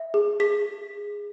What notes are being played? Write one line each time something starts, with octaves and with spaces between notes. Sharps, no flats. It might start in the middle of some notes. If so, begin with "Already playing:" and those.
Already playing: E5
G#4
G#4 B6